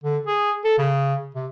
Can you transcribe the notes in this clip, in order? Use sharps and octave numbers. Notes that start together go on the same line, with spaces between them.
D3
G#4
A4
C#3
C3